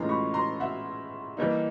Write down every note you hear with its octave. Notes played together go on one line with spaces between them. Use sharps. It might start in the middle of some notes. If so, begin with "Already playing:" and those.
Already playing: A2 E3 G#3 C#4 F4 A#5 C6
B5 C#6
A#5 C6
E5 F#5
E3 G3 A#3 D#4